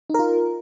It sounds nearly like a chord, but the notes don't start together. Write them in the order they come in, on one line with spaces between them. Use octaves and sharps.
D#4 A#4 F4